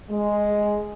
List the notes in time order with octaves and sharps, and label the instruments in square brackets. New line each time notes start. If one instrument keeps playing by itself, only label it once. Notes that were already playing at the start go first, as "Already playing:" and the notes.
[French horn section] G#3